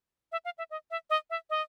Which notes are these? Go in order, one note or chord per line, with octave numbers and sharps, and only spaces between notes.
E5
F5
E5
D#5
E5
D#5
E5
D#5